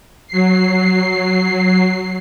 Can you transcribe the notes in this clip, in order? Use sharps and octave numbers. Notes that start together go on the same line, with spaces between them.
F#3 C7